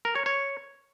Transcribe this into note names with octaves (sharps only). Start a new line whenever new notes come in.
A#4
C#5
C#5